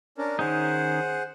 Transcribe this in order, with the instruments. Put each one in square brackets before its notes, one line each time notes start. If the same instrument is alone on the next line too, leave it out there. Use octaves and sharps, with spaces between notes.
[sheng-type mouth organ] C#4 D4 A#4
[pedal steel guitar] D#3 C#4 D#4 [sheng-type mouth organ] G#4 C5 F#5